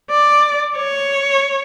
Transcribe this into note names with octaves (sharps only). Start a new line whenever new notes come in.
D5
C#5